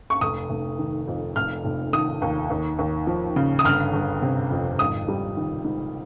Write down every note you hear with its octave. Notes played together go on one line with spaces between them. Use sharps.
C#6
F1 D#6
F1
D#3
F2
F1 F6
F1
D#3 D#6
D#2
D#2
D#2
F3
C#3
D#6
G1 F6
G1
C3
F2
G#1 D#6
G3
D#3
G#2